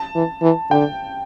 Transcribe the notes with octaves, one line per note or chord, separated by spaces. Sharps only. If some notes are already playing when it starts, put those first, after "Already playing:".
Already playing: A5
E3
E3
D3 G5